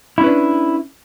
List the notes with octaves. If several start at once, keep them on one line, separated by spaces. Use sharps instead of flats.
C#4 D4 E4 B4